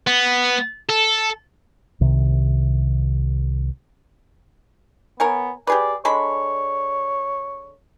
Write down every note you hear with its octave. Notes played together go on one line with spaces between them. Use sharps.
B3
A4
C2 C3 D#3
B3 A#4 C#5 G#5
G4 G#4 B4 D5
D3 G#3 C#5 B5